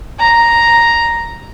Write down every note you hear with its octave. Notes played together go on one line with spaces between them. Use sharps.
A#5